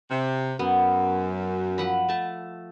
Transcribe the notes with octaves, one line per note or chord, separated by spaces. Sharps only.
C3
F#2 B3
F3 F#5 B5
A3 A5